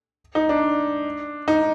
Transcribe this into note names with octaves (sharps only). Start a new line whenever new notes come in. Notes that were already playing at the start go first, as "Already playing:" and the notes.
D#4
D4
D#4